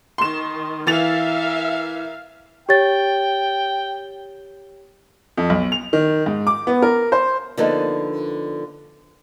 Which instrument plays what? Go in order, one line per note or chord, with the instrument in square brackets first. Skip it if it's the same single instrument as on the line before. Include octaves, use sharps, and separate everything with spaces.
[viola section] D#3 [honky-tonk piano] C6 E7
[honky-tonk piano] E3 A6 F7 [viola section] A#4 E5 F5
[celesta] G4 C#5 A6 [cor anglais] G5
[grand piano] F2
B1
F7
D#3
G#2
D6
B3
A#4
C5
[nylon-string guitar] D3 F3 A#3 B3 D4 D#4